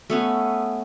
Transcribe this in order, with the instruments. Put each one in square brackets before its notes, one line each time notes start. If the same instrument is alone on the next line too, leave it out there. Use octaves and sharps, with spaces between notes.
[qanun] A3 B3 C#4